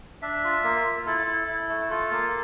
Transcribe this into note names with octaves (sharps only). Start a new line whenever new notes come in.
D4 E5
F4
A#3
F4
E4 A4
E4
E4
A3
F4 A4
A#3